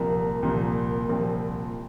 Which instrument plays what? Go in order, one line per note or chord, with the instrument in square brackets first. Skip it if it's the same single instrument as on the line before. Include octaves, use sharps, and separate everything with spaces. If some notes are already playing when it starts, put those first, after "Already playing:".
Already playing: [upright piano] C2 A#2 F3 [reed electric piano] A#4
[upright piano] C2 A#2 F3
C2 A#2 F3 C4